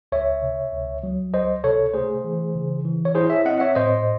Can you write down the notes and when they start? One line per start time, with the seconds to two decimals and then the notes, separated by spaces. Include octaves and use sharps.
0.12 C#2 C#5 E5
0.42 C3
0.73 C#2
1.03 F#3
1.33 C#2 C5 D#5
1.64 C3 A4 C#5
1.94 A3 G#4 C5
2.24 E3
2.55 C#3
2.85 E3
3.05 C#5
3.15 E4 G#4 C5
3.30 C#5 E5
3.45 C4 D#5 F#5
3.60 C#5 E5
3.75 A2 C5 D#5